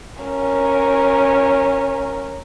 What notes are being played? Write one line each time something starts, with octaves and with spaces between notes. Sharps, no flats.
C#4 A#4